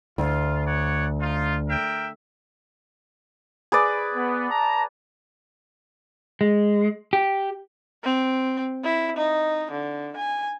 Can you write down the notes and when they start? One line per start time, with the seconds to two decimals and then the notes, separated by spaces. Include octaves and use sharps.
0.18 D2 F4
0.65 C#5 D5 F#5
1.20 D#4 F4
1.69 A#4 E5 G5
3.72 G#4 B4 D5
4.15 B3
4.51 A5 A#5
6.41 G#3
7.13 G4
8.04 C4
8.84 E4
9.17 D#4
9.71 D3
10.17 G#5